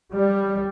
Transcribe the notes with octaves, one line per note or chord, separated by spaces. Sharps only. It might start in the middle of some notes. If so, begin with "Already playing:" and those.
G3